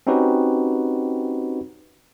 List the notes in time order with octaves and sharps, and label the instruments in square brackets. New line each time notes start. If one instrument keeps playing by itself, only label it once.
[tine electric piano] C4 C#4 D#4 F#4 G4 B4